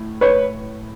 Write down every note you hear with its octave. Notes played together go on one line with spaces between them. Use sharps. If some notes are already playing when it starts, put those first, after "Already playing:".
Already playing: A2
B4 C#5